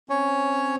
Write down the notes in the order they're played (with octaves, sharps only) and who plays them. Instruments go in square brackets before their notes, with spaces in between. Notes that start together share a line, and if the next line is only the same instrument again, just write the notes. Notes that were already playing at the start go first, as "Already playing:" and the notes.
[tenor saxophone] C4 [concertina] C#4 C#5